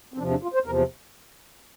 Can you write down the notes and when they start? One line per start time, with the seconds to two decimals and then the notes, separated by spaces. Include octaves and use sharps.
0.14 C4
0.18 E2 C3 F3 D4
0.31 D4
0.42 F4
0.54 C5
0.65 E2 C3 F3 A#4